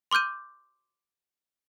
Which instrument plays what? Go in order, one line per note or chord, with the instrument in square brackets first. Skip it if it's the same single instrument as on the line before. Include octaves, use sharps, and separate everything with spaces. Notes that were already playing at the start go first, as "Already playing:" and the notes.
[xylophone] C6 D6 F6 G6 D#7